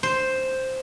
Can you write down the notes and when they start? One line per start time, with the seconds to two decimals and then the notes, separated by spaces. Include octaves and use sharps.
0.03 C5